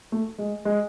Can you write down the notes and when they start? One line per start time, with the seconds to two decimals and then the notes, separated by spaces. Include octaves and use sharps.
0.12 A3
0.39 G#3
0.65 G#3